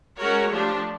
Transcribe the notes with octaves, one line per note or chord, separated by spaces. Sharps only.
G#3 C#4 F#4 A#4 C#5
F3 A3 D4 G4